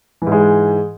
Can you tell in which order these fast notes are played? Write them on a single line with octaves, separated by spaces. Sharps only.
E3 G#2 G#3